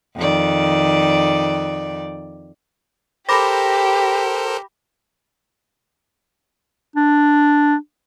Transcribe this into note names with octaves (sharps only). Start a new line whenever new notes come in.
F2 D#3 D5
G4 A4 A#4 C5 B5 D6 A#6
D4